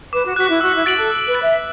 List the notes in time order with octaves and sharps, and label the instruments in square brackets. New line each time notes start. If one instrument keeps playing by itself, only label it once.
[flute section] B4 [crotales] D6
[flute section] F#4
[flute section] F#4 [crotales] F#6 B6
[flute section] E4
[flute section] F#4 [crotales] E6
[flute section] E4
[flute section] F#4 [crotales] A6 D7 F#7
[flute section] A4
[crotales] E6
[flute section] B4
[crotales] A6 D7 F#7
[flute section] E5